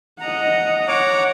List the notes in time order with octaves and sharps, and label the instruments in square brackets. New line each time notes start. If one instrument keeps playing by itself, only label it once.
[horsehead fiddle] D#5 F#5 [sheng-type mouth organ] A#5
[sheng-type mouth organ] C#5 A#5 D6 [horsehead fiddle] F#5